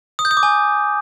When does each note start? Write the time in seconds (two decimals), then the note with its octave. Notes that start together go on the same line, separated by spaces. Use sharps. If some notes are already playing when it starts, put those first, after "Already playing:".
0.19 D#6
0.25 G6
0.31 D#6
0.37 D6
0.43 G#5